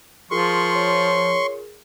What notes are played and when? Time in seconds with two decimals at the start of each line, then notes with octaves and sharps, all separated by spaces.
0.31 F3 F4 G#4 A#4 C6 C#6
0.76 C#5